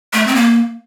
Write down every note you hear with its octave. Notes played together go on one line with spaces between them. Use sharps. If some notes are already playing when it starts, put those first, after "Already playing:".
A3
C4
A#3